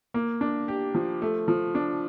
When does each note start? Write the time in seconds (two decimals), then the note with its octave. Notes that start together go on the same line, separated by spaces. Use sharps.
0.14 A#3
0.41 D4
0.68 G4
0.95 F3
1.22 A3
1.48 F3
1.75 D4